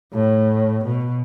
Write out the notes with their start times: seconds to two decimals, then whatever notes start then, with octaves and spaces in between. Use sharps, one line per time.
0.14 A2
0.84 B2